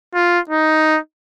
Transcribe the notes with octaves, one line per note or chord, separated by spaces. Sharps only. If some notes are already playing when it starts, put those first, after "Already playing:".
F4
D#4